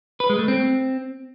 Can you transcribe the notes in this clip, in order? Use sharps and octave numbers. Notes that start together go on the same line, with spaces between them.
B4
G#3
A3
C4